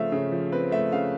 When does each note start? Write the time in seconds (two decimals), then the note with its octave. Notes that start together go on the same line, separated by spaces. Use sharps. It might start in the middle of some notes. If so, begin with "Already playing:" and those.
Already playing: C#3 F3 A3 C4 E5 F5
0.12 C#3
0.32 F3
0.52 C4 B4
0.71 A3 E5
0.92 C#3 F5